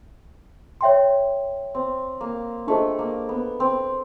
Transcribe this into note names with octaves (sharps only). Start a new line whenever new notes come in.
C#5 E5 G5 C6
C4
A#3
A3 D4 F4 G#4 C5 D#5
A#3
B3
C4